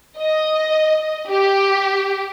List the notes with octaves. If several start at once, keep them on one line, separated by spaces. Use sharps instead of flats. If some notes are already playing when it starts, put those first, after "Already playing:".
D#5
G4